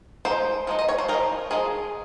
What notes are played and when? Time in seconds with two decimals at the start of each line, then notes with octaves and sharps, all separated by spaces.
0.25 F3 G#3 D#4 C5
0.67 F3 G#3 D#4
0.79 D#5
0.88 C#5
0.98 C5
1.08 F3 G#3 D#4 A#4
1.51 F3 G#3 D#4 G#4